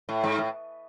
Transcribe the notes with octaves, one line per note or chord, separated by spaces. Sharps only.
A2
G#2
A2